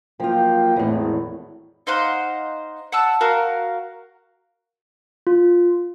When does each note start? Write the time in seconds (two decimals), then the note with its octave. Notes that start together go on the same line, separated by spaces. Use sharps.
0.20 F3 F#3 A#3 F4 G5
0.76 G#1 E2 A2
1.87 D#4 C5 F5 F#5
2.92 F#5 A5 E6
3.21 F#4 A#4 F5
5.27 F4